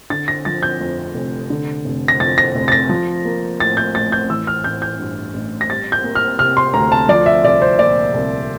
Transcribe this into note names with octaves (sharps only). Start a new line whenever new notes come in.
D3 A6
A#6
F3 A6
G6
F2
F1
D3
F1
A#6
F2 A6
A#6
F1
A6
A#6
F3
A#3
A2 A6
G6
A1 A6
G6
E3 E6
F6
A1 G6
G6
G2
A1
A#6
G3 A6
G6
A#3
F6
C3 F6
C6
D2 A#5
A5
F3 D5
E5
C2 D5
C5
A#2 D5
C2